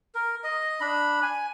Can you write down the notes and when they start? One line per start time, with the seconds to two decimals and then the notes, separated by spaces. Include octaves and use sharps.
0.15 A#4
0.44 D#5
0.81 D4 B5
1.22 G#5